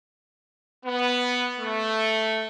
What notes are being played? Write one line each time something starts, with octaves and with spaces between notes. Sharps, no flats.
B3
A3